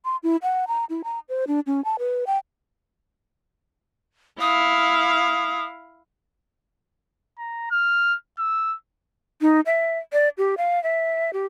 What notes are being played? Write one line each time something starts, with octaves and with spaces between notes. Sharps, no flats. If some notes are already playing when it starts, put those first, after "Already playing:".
C6
E4
F#5
A#5
E4
A#5
C5
D4
C#4
A5
B4
G5
E4 F5 D#6
A#5
F6
E6
D#4
E5
D5
G4
F5
E5
G4